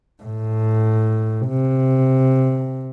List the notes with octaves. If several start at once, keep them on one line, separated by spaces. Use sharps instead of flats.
A2
C3